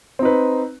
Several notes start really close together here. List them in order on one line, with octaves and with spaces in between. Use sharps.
C4 D#4 B4